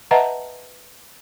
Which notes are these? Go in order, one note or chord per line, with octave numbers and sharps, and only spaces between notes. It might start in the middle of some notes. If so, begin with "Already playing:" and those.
B4 D#5 E5 F#5 A5 A#5